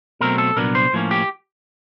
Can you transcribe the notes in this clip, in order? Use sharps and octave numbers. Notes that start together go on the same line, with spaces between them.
B2 F#3 A3 C4 A#4
A4
C2 A#2 F#3 B3 D4 A#4
C5
A2 F3 A#3 C#4
G4